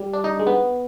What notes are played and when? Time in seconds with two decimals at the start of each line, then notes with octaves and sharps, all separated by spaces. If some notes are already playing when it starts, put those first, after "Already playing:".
Already playing: G3
0.14 D4
0.24 D#4
0.39 G#3
0.47 B3